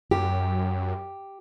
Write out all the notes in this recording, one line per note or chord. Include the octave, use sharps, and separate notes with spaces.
F#2 G4